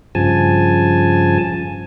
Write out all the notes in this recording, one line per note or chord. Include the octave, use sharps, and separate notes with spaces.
G2 C#3 F3 G#5 A5